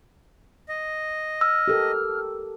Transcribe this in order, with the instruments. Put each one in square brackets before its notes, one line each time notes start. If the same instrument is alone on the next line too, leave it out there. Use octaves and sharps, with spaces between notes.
[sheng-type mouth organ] D#5
[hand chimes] E6 [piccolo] F6
[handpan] G4 A4 A#4